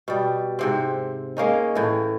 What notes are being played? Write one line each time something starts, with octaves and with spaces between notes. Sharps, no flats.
B2 G3
G#2 C3 C4
G#3 A#3 C#4 D#4
A2 E3